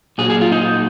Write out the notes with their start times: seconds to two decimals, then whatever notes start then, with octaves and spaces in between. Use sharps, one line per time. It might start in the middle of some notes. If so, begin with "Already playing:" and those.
0.18 A#2 F#3 G#4
0.30 G#4
0.41 F4
0.52 D#4